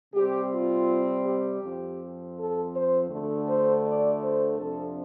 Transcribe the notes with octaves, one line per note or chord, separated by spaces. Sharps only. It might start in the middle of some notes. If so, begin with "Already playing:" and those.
C3 G3 C4 G4
F4
G4
F2 F3 C4
A4
C5
D2 D3 A3
C5
D5
C5
F2 C3 F3 D4 A4